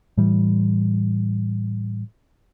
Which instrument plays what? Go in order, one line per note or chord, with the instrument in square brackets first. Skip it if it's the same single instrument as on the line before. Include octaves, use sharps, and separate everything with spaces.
[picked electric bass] A2 E3 G3